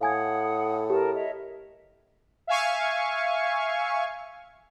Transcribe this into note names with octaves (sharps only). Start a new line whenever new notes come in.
A2 F5 F#5 G#5 D#6 G#6
G4 A#4 A5
C#5 D#5 E5
E5 F5 G#5 C#6